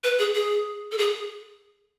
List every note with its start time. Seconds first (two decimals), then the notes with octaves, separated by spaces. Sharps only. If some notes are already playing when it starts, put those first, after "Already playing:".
0.04 B4
0.19 G#4
0.35 G#4
0.92 A4
0.98 G#4